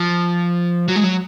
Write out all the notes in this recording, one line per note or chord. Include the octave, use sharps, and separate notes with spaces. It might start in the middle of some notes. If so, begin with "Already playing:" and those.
Already playing: F3
F#3
G#3
F#3